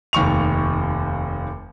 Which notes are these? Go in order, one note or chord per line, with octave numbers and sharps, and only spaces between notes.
F1 D#2 C#6 F7